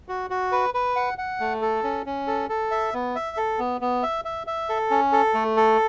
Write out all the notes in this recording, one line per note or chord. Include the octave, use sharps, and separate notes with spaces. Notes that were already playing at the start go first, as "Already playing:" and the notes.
F#4
F#4
B4
B4
F#5
F#5
A3
A4
C#4
C#4
A4
A4
E5
B3
E5
A4
B3
B3
E5
E5
E5
A4
C#4
A4
A3
A4